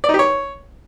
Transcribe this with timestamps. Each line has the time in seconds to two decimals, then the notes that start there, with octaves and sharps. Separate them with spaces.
0.04 D5
0.09 D#4
0.14 G4
0.19 C#5